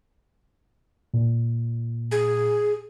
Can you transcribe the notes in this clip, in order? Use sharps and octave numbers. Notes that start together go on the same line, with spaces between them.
A#2
G#4